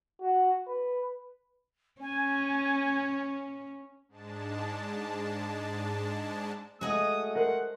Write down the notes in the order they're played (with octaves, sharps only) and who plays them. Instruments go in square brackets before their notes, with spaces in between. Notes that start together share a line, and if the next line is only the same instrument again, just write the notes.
[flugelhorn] F#4
B4
[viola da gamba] C#4 [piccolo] G#5
[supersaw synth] G#2 G#3 D4 A5
[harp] G#3 A#5 [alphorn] A3 [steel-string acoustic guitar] F#4 G#4 D#5 [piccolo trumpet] D#6
[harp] A#4 C5 [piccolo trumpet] F#5